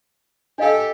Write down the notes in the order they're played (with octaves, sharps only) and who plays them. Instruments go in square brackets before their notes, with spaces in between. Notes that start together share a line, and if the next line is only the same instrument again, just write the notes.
[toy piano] D4 D#5 F5 [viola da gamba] G4 A4